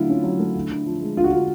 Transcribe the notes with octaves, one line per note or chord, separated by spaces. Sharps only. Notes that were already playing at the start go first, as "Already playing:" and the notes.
Already playing: D3 F#3 A3 E4 F4
C#4
F#3
A3
D3
D3
F3
G#3
D3 F4
F#4
D3 F4